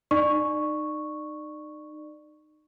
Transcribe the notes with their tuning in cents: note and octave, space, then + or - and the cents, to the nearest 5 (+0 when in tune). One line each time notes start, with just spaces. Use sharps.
D#4 -25 D5 +20 C#6 +0